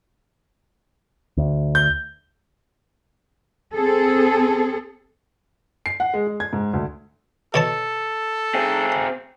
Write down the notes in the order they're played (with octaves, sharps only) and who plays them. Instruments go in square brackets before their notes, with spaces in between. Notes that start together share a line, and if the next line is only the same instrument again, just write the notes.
[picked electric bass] D2
[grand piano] G6
[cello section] C4 G#4 A4
[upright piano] C7
F#5
G#3
G#3
G#6
G#2
D2
[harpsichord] B2 C#5 A5 [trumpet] A4
[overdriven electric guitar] C4 G#4